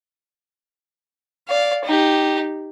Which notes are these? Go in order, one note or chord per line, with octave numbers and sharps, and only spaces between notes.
D5 F5
D#4 G4